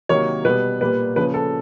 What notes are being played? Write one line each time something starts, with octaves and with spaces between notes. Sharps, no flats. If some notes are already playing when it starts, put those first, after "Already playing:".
C3 D#3 F#3 A#3 C#5
B2 G3 B3 B4
A#2 G3 A#3 B4
C#3 F3 A#3 B4
A4